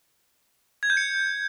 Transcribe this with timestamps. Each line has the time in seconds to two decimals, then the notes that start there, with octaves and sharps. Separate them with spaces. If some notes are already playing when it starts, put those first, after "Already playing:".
0.83 G#6
0.90 G6
0.97 C#7